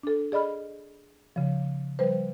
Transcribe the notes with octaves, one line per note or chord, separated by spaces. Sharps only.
D4 A4
G#4 D5 D#5 B5 F6
C#3 F3
F3 G3 B4 C5